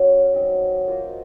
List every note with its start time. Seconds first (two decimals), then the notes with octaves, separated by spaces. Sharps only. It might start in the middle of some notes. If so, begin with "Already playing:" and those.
Already playing: C#4 F#4 C#5 F5
0.34 F#3 C4 D#4
0.87 A#3 F4 C5 D#5